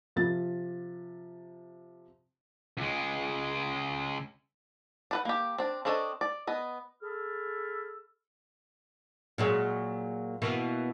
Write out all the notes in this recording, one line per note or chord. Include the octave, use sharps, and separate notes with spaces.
C3 F3 A6
C#2 G#3
D4 B4 F#5
A#3 G4
C4 D4
C4 D4 A4 C#5 D#5
D5
B3 D#5
G#4 A4 A5 B5 E6 F6
A#2 F#3 G#3
B2 E3 A#3